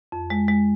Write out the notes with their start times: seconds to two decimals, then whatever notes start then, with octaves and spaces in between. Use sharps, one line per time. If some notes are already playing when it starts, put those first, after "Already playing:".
0.12 F2
0.30 G#3
0.48 G#3